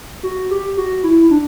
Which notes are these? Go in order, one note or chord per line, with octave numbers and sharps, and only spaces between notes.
F#4
G4
F#4
E4
D4